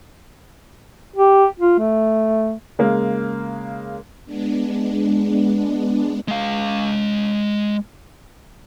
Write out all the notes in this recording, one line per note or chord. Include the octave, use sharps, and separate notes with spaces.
G4
F4
A3
C#3 G#3 A#3
G#3 B3 D4
G#3 F5